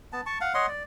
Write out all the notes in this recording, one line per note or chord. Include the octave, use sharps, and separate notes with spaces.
B3 A5
A5 C#6
F5 F#5
C#5 D#5 F#5 C6
D5